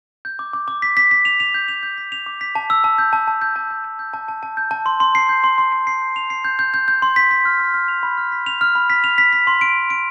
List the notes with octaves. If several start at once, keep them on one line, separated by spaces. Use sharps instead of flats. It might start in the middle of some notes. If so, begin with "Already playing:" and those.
G6
D6
D6
D6
B6
B6
B6
F7
F7
G6
F7
G6
B6
F7
D6
B6
A5
E6
A5
G6
A5
A5
G6
A5
A5
G6
G6
A5
A5
A5
G6
A5
C6
C6
C7
G6
C6
C6
C7
C7
G6
F7
C7
G6
G6
G6
G6
C6
B6
B6
F6
F6
F6
F7
B5
F6
B6
F7
F6
B5
B6
F7
B6
B6
C6
D7
B6
D7